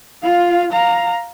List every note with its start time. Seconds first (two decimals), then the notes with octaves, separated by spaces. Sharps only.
0.23 F4 F5
0.72 F5 A#5